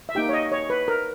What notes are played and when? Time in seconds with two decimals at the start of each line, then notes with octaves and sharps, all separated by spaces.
0.09 E5
0.15 A#3 D#4 G4 G5
0.29 C#5
0.33 D#5
0.52 C#5
0.70 B4
0.88 A#4